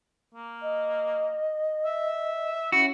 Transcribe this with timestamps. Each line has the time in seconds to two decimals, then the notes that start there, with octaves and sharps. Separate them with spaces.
0.35 A#3
0.62 D#5
1.85 E5
2.72 C#4 E4 F#4